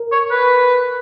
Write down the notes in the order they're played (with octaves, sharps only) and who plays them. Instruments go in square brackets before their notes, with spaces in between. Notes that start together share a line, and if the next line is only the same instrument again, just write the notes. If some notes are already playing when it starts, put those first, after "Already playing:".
Already playing: [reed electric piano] A#4
[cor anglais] C#5
B4